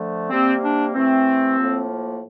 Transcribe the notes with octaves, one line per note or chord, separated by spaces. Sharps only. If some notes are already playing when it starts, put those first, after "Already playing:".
Already playing: D3 F3 A3
C3 G3 A#3 C4
D4
C3 E3 A3 C4
A2 F3 A#3